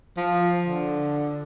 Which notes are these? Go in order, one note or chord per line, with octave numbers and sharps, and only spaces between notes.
F3
D3